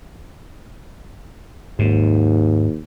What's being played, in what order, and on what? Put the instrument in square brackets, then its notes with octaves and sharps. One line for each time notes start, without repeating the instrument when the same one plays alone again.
[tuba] D#2 [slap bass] G#2